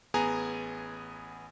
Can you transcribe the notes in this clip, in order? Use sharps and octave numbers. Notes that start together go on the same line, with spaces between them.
A1 B3 G#4 G#5 A#5